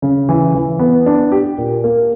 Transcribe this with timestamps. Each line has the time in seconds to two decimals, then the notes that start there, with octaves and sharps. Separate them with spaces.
0.02 C#3
0.29 E3
0.55 E3
0.79 B3
1.06 D4
1.32 G4
1.58 A#2
1.84 A#3